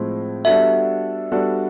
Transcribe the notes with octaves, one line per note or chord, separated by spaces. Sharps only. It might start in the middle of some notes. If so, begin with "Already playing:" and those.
Already playing: A2 F3 G#3 C4
G3 B3 D4 F#4 A4 E5
G3 B3 D4 F#4 A4